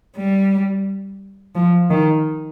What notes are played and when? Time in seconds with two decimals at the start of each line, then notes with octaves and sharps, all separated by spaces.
0.16 G3
1.55 F3
1.90 D#3